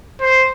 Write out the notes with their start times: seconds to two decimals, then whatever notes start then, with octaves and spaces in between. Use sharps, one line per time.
0.21 C5